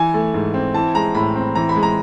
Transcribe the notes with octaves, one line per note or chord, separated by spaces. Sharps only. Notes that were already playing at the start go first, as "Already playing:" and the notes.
Already playing: E3 G#5
A3
G#2
C4
E3 A5
G#3 A#5
A2 B5
C4
E3 A#5
B5
G#3
A#5